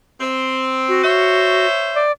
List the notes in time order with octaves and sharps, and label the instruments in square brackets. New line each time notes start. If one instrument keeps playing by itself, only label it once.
[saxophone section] C4
[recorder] F#4
[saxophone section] C5 C#5 E5
[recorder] D5